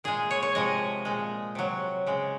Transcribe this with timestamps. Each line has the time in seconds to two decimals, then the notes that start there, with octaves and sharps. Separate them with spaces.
0.04 A#2 G#3 G#4
0.31 C#5
0.43 C#5
0.55 C3 F3 G#3 D#5
1.05 A#2 G#3
1.55 C3 F#3
2.06 C#3 G#3